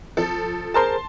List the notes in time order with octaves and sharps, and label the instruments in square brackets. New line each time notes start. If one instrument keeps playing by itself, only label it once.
[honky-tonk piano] F3 A4
[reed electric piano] G#4 A#4 C5 [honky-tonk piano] A5 C6